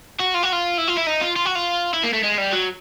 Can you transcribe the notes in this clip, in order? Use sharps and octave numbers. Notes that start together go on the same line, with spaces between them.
F#4
F4
F#4
F4
E4
F4
E4
D#4
F4
F4
F#4
F4
E4
A#3
A3
G#3
G3
F#3